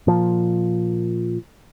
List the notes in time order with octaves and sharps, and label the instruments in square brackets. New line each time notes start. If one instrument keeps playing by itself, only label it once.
[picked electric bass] A#2 F3